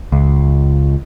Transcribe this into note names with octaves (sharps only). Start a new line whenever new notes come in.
C#2